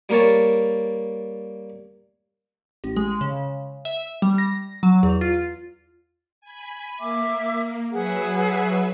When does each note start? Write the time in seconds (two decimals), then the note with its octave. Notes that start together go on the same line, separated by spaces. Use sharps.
0.09 G3 A#3 A#4 C#5 A5
2.84 A1
2.96 G#3
3.21 C#3
3.85 E5
4.22 G3
4.38 A#6
4.83 F#3
5.03 E2
5.21 F4
6.41 G#5 B5
6.99 A#3 E5 D6
7.92 F#3 G#4 B4 E5 F#5